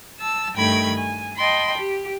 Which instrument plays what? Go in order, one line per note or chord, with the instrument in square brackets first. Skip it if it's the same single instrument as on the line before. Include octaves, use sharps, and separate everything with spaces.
[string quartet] A5 E6
G2 D#3 A3 G5 B5 G#6
G#5
D#5 G5 A5 B5 C6
G4